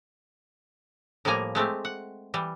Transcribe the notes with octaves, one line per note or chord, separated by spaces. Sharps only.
A2 F3 G3 A#3 G#5 A#5
G#3 A3 C4 G4
F#5
E3 G3